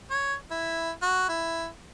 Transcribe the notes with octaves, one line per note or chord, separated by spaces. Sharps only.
C#5
E4
F#4
E4